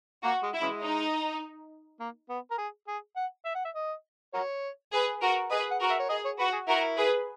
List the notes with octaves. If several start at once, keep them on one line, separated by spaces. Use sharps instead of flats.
A#3 F#4
G#3
E4
C#3 E3 G#3
D#4
A#3
B3
A#4
G#4
G#4
F#5
E5
F#5
E5
D#5
F#4 A#4 C#5
G#4 B4
F#4 A#4
G#4 B4 D#5
F#5
F#4 A#4
E5
C#5
G#4 D#5
C#5
F#4 B4
G#4
E4 F#4 A#4
G#4 B4